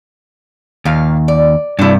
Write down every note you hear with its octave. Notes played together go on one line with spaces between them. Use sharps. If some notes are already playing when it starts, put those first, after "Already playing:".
D#2 A#2 F5
D5
G2 C3 D4 E4